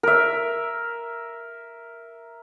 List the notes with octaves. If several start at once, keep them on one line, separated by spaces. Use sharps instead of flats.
A#4 E5